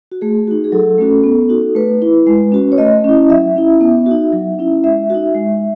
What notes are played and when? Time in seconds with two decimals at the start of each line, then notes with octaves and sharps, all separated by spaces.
0.12 F#4
0.21 A3 G#4
0.48 D#4 F#4
0.64 G#4
0.72 F#3 A4
0.98 A3 C#4 F#4
1.24 B3
1.49 D#4 F#4
1.75 A3 B4
2.02 E4
2.27 G#3
2.52 C#4 F#4
2.72 C#5
2.78 A3 D#5
3.04 C#4 E4
3.29 F#3 E5
3.56 C#4 E4
3.81 B3
4.06 D#4 F#4
4.33 F#3
4.59 C#4 E4
4.84 G#3 E5
5.10 D#4 F#4
5.35 G#3